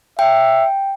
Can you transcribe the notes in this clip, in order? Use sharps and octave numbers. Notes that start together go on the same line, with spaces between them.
E5 G5